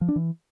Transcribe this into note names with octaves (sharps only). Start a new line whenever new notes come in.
F3
D4
E3